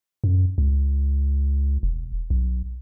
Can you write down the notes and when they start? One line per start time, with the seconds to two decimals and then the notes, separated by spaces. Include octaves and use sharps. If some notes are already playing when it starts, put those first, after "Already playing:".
0.24 F#2
0.58 C#2
1.83 E1
2.30 B1